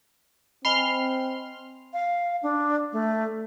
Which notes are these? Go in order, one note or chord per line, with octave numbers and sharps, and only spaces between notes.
C4 D#5 G#5 B5 C6 F6
F5
D4
A3